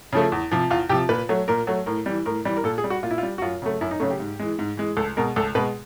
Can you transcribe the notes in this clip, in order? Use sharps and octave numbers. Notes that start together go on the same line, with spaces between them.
C#3 F3 A3
E2
C3 F3
E2 F4
C3 F3 G4
A#2 B4
F#3 A3
A#2 A#4
F#3 A3
A2 A#4
E3 G3
A2 A#4
E3 G3
A#4
A#2 A4
G#4
G3
F#4
A#2 F4
E4
F4
G3
F#4
F#2 F4
C#3 F#3 A3
F#2 E4
D#4
C#3 F#3 A3 C#4
G4
G#2
E3 G#3
G#2
E3 G#3
C#2 A4
B2 G#3 A#4
C#2 A4
B2 G#3 B4